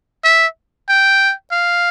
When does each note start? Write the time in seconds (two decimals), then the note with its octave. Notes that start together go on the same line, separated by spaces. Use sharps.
0.24 E5
0.89 G5
1.51 F5